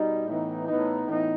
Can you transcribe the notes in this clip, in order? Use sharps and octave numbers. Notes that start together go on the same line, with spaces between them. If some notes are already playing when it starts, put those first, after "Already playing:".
Already playing: B2 G3 D#4
A2 E3 B3 D#4
A2 E3 B3 D#4
A2 E3 B3 D#4